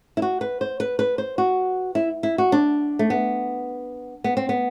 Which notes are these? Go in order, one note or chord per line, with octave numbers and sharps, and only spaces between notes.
E4
F#4
B4
C5
B4
B4
C5
F#4
E4
E4
F#4
D4
A3
B3
B3
C4
B3